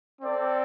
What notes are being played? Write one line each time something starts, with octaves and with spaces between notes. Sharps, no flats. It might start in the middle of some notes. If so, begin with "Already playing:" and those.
C4 A4 D5 G5